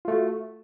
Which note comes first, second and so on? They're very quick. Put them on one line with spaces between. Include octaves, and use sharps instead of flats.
F4 A3 F#4